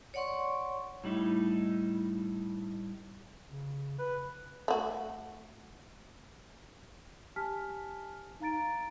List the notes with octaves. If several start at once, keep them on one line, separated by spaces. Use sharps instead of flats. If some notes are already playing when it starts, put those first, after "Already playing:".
C#5 D5 F#5 C6 C#6
A2 G3 D#4 E4
C#3
B4
A3 F#4
G4 G#5 A5 F6 B6
D#4 F5 A#5 A6 D7